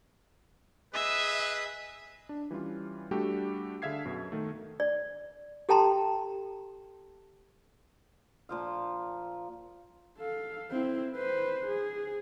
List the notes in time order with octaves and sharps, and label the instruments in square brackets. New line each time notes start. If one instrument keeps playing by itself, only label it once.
[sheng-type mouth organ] G#4 D#5 D#6 [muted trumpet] B4 [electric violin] E5
[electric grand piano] D4
E3 G3 C#4 F4
G3 A3 D4 F#4 G4 A4
D3 G#4 E5 F5 G#6 C7
F#2 B2
D#3 A3
[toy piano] D5
G4 A4 G5 A5 A#5 C6
[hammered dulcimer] A#2 F3 F5
[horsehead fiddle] A4 F5
C4 E4
B4 C5
G#4